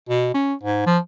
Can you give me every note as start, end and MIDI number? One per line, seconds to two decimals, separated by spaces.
0.09 0.31 47
0.34 0.54 61
0.63 0.82 44
0.86 0.98 53